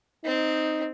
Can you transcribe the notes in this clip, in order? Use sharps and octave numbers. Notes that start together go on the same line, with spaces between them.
C4 D#4